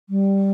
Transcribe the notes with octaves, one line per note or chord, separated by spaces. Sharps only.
G3